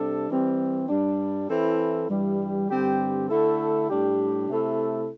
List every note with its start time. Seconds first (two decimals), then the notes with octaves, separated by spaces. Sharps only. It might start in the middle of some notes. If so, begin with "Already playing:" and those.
Already playing: C3 G3 D4 A4
0.29 E3 G3 C4
0.89 G2 G3 D4
1.49 E3 C4 E4 A4
2.09 G2 E3 G3
2.69 G2 D3 G3 C4 G4
3.29 D3 A3 E4 A4
3.89 A2 G3 D4 G4
4.49 C3 A3 E4 A4